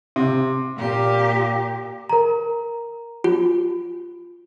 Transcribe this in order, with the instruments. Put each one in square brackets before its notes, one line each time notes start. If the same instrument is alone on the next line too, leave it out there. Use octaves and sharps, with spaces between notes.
[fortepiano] C3
[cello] A#2 G4
[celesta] A#4 A#5
[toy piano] F4